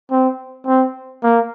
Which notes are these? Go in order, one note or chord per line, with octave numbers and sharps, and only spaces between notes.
C4
C4
A#3